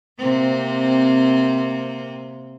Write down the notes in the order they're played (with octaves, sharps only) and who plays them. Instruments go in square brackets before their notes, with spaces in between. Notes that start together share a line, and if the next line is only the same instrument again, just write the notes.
[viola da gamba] C3 A#3 C4